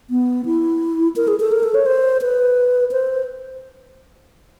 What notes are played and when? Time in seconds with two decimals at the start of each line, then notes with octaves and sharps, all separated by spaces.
0.10 B3
0.45 E4
1.16 A#4
1.28 G#4
1.40 A4
1.52 A#4
1.63 A4
1.74 C#5
1.86 C5
2.22 B4
2.91 C5